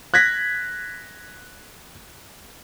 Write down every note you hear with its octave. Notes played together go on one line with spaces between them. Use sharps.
F#6 G#6 A#6 B6